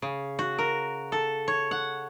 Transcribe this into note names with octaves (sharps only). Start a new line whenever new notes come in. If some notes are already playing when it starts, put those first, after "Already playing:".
C#3
F#4
A#4
A4
C#5
F#5